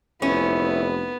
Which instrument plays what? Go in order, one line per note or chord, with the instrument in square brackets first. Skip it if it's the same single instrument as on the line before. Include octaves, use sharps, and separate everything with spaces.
[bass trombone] F1 [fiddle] B3 [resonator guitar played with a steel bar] C#4 [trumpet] E4